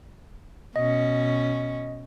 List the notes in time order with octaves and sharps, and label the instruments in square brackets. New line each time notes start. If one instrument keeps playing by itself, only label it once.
[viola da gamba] B2 C#4 [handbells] D#5